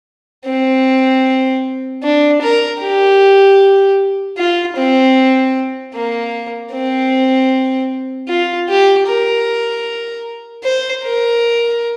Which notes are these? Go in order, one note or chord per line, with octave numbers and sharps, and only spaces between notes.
C4
D4
A#4
G4
F4
C4
A#3
C4
F4
G4
A#4
C5
A#4